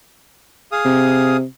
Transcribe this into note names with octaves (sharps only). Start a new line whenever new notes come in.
G#4 F5 D#6
C3